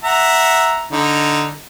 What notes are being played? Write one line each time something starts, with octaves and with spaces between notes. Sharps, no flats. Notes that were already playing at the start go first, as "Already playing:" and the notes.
E5 F#5 A#5
D3 D#4